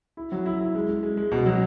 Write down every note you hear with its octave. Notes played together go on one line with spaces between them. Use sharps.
E4
F#3
E4
E4
G#3
G#3
G#3
G#3
B2
F#3